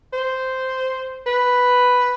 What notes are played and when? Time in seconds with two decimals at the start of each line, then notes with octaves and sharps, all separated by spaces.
0.13 C5
1.26 B4